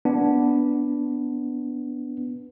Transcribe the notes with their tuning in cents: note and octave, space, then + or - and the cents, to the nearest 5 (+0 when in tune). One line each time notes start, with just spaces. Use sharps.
B3 +0 D4 -10